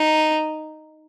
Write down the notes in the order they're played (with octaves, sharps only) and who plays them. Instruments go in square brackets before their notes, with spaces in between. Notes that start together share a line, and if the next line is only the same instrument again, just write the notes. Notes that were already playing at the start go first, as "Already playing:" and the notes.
Already playing: [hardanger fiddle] D#4